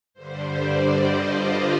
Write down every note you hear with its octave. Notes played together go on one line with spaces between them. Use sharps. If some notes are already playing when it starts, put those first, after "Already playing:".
G2 D3 G3 C5
D5
D#5
F4